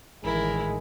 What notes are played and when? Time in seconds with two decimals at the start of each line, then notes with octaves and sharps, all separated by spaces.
0.24 A1 D#3 G#3 E4 A#4